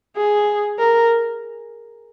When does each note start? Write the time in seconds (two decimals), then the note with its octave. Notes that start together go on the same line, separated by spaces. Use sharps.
0.17 G#4
0.79 A#4